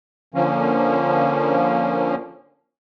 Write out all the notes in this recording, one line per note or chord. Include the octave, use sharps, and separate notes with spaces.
D3 F3 A#3 C#4